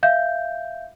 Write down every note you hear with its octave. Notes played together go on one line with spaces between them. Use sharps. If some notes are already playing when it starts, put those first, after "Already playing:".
E5 F5 G6